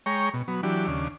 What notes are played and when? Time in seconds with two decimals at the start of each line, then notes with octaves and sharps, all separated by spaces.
0.06 G#3 C#5 G5 A#5 C#6
0.34 B2
0.48 F#3 B3
0.63 E3 F#3 D4 G4
0.87 D#2 C#3 D4